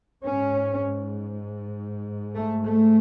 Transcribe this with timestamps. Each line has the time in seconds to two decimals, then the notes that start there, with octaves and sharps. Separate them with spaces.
0.24 G#2 C#4
2.35 A3
2.65 A3